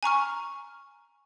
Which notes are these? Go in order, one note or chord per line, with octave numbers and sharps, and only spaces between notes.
G#5 A#5 C#6 F6